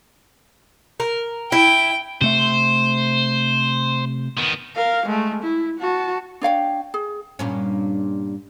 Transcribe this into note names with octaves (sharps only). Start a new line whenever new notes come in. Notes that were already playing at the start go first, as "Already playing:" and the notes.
A#4
E4 G5
C3 A3 C5 E5
D#3 B3
A#4 F5
G#3 A3
E4
F#4 A5
D4 C#5 F5 G5
G#4
G2 A#2 C#4